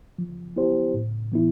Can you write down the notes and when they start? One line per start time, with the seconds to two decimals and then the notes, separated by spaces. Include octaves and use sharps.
0.18 F3
0.56 B3 E4 G4 C5
0.94 A2
1.32 E3 B3 E4